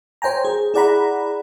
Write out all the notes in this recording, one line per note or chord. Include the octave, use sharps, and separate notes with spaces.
C5 C#5 G5 G#5 A#5
G#4
E4 G#4 D5 F#5 A#5 B5